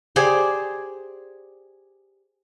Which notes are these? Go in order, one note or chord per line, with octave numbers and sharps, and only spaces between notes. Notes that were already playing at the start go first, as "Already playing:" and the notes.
G4 G#4 C5 D5